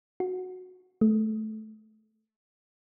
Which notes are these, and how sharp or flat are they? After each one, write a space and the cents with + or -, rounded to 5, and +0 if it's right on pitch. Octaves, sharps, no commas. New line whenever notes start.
F#4 -10
A3 -20